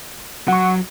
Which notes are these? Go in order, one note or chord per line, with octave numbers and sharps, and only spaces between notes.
F#3 F#5 C#6